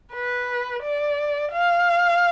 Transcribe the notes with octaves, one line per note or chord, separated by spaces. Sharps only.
B4
D5
F5